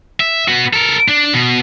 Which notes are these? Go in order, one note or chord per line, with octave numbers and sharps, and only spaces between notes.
E5
B3 F#4
A4 A#4
D4
B2